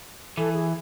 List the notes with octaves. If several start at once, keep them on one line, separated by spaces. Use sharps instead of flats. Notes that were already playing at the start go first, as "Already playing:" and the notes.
E3 A4
G#4